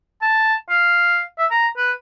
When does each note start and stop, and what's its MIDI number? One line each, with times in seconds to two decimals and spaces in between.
0.22 0.54 81
0.70 1.22 77
1.38 1.46 76
1.51 1.68 82
1.77 1.92 71